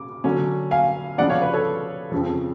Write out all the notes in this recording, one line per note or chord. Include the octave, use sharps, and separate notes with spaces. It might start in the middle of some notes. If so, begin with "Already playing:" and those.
Already playing: C#3 D6
D3 F#3 C#4
F5 G#5
C#3 F3 B3 D4 D5 F#5
C#5 F5
B4
A4 C#5
F2 C#3 F3